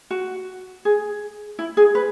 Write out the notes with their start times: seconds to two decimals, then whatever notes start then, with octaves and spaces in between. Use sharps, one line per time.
0.11 F#4
0.85 G#4
1.59 E4
1.77 G#4
1.95 B4